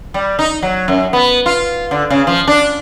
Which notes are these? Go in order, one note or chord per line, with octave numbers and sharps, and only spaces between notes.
G3
D#4
F#3
F#2
B3
F4
D3
C#3
F3
D4